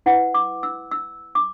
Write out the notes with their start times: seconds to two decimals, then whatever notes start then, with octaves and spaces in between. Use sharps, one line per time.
0.06 E4 B4 F#5
0.34 D6
0.63 E6
0.91 E6
1.35 D6